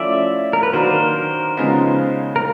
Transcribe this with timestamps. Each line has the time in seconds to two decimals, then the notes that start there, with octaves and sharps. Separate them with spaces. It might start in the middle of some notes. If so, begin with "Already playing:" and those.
Already playing: F3 A3 C#4 E4 D5 E5
0.53 A#4
0.63 B4
0.73 D#3 F#3 A#3 D4 F#4 A#4 C5
1.57 C#3 F3 G#3 B3 D#4
2.36 A#4